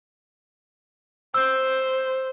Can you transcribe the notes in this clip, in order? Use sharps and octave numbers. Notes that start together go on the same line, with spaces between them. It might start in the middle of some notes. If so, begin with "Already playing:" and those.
C5 E6 G6